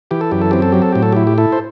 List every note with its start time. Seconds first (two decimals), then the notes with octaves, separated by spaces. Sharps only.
0.11 E3 G4
0.21 A4
0.31 F#2 G4
0.41 A4
0.51 C4 G4
0.62 A4
0.72 F#3 G4
0.82 A4
0.92 A2 G4
1.03 A4
1.12 E4 G4
1.27 G4
1.38 E4 A4
1.52 C5